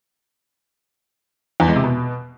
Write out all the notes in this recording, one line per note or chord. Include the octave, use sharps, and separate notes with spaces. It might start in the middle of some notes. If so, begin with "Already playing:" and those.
E2
G#3
C3
B2